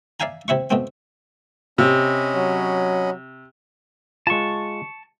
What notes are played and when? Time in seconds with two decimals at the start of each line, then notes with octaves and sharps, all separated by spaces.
0.20 D5 E5 F5 G#5 A#5
0.48 C3 E4 E5 C#6
0.71 B2 A3 C4
1.78 C3 C#4 D#5 B5
2.36 F#3
4.27 G#3 F4 A5 C#6